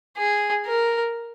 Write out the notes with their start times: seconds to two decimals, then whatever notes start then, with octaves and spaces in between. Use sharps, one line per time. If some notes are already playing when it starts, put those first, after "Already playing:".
0.17 G#4
0.66 A#4